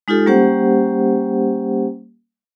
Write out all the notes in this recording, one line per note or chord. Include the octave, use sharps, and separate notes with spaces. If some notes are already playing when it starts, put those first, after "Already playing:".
G#3 D#4 F4 G4 A4
G3 A#3 C#4 G4 C5 F#5